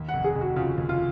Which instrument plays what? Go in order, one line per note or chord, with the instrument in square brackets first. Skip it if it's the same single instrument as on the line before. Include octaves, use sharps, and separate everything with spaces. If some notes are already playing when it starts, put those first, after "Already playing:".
Already playing: [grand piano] D#2
[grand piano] F1 [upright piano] F#5
[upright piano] G#4
[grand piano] F1
[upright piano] F#4
[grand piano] C#3 [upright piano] F4
[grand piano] D#2
[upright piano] F4